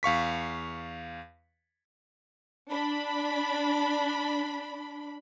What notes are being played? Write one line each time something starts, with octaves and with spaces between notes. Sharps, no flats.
E2 F5 C#6 B6
D4 B5